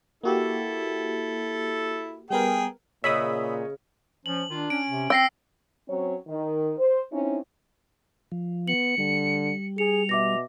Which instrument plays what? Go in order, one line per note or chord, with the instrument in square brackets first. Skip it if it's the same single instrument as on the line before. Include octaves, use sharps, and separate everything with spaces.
[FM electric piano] A#3 F#4 G4 [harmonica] E4 A4
[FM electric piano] G3 B3 A#4 [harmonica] G#4 G5
[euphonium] A#2 [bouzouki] C#3 [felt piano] C#5 D#5 [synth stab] E5 B5 D#6
[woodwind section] F3 [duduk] C#4 [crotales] F#7
[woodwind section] D#3 F4 [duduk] D4
[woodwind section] C#4 [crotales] D7
[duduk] C3
[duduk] C4 [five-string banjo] G5 [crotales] E6 A#6 C7
[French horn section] F#3 C4 C#4 C#5
D#3
C5
C4 C#4 D#4 E4
[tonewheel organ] F3
[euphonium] B3 [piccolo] C#7 [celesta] F#7
[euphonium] D3 [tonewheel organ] G3
[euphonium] G#4 [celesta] C#7 [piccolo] F7
[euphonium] B2 [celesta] E5 D6 A#6